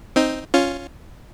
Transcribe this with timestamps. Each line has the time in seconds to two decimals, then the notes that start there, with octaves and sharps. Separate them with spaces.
0.16 C4 D#4
0.54 C#4 F4